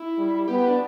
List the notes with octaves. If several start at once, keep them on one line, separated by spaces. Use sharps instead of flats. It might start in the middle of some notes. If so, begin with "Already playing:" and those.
Already playing: E4
G3
B3 G4
G4
D4